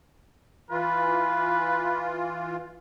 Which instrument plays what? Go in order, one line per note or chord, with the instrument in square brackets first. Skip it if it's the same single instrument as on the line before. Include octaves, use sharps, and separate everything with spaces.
[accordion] E3 F4 [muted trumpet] B4